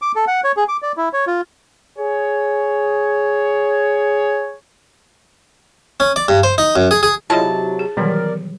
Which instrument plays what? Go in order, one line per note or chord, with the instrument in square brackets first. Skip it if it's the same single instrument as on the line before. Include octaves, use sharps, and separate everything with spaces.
[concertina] D6
A4
F#5
C#5
G#4
D6
D5
E4
C#5
F4
[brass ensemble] G#4 C#5
[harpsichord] C#4
D5
G2
C5
D#4
F#2
G#4
G#4
[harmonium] C3 F#3 [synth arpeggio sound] E4 F4 D#5 [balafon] G#4 C#5 [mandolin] A5
[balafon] G#4
[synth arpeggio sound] B2 G3 [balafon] D#3 E3 F#3 [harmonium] A#4 D5